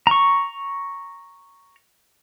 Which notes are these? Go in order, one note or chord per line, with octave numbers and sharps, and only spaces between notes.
A#5 C#6